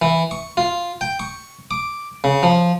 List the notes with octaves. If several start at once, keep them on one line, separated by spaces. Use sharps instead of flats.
E3
C#6
F4
G5
C#6
D6
C#3
F3